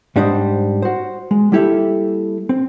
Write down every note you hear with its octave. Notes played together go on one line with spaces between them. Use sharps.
G#2 G3 D4 C5 D#5
F#4 C5
G#3
G3 A#3 E4 G4 A4 E5
C4